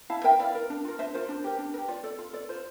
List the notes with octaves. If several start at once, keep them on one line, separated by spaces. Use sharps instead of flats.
E4 F5 A5
A#4 E5 G5
E4 D5 F5
A#4
D4
F4 A#4
D4 C5 E5
F4 A#4 C5
D4
G4 A#4
D4
A#4
G4
F4 D5
A4 D5
F4
A4 D5
F4 C5